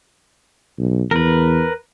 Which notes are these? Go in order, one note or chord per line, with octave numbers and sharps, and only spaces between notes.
B1
E2 A#4 B4